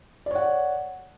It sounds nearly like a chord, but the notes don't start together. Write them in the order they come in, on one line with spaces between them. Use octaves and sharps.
D5 C#5 F#5